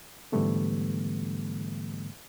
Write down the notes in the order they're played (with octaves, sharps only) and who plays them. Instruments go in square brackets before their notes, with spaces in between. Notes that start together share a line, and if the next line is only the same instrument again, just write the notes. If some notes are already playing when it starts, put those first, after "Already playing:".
[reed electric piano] G#2 D3 E3 G3 A3 B3